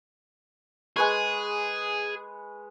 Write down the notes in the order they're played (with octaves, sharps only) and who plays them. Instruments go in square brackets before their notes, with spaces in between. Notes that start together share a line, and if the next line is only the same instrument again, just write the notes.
[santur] G#3 B4 C#6 [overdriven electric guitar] G#4